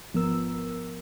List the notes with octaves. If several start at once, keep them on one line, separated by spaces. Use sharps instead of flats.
G#1 F3 B3 A#4 E6